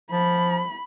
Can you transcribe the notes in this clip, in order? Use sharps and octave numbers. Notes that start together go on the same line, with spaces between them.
F3 B5